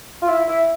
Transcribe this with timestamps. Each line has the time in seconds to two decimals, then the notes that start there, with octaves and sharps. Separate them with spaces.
0.22 F4
0.28 E4
0.48 E4